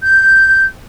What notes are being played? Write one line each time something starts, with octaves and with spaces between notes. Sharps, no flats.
G6